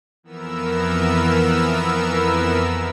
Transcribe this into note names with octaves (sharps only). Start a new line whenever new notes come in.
F2 E3 B3 A#4 E6